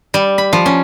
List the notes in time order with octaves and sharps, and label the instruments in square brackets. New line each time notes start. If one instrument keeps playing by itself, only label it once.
[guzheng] G3
B5
F3
C#4